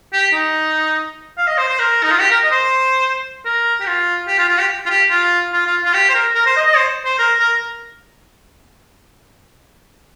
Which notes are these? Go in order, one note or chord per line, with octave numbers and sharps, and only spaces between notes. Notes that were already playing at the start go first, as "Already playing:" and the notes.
G4
D#4
F5
D#5
C5
C5
A#4
D#4
F4
G4
A#4
D#5
C5
A#4
G4
F4
G4
F4
F4
G4
F4
G4
F4
F4
F4
F4
G4
C5
A#4
A#4
C5
D#5
D#5
C5
C5
A#4
A#4